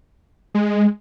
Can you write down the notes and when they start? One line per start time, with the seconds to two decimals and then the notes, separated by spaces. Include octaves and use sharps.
0.55 G#3